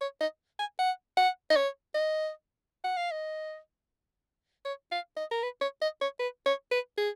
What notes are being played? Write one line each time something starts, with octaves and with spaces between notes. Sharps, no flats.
C#5
D#5
G#5
F#5
F#5
D#5
C#5
D#5
F#5
F5
D#5
C#5
F5
D#5
A#4
B4
C#5
D#5
C#5
B4
C#5
B4
G#4